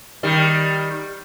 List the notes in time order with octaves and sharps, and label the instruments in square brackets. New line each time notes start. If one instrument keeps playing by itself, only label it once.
[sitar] D#3 G3